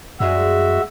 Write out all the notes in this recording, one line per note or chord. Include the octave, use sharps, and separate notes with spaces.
F#2 G3 G#3 F#4 G#4 E5